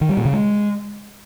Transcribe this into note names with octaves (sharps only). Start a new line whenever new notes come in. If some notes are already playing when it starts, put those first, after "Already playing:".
D#3
G3
A#2
C#3
G#3